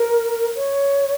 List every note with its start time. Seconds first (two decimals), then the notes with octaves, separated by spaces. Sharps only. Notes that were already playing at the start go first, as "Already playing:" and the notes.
Already playing: A#4
0.55 C#5